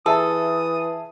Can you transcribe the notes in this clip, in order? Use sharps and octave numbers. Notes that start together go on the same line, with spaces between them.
E3 G#4 A4 E5 A5 D#6